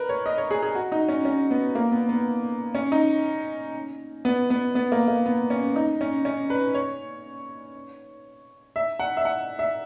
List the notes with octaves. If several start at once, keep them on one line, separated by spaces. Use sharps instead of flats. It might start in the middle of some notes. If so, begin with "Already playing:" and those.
Already playing: A#4 B4
C#5
D#5
C#5
G#4
G#4
F#4
D#4
C#4
C#4
B3
A#3
B3
B3
C#4
D#4
B3
B3
B3
A#3
A#3
B3
C#4
D#4
C#4
C#4
B4
C#5
E5
F#5
E5
F#5
E5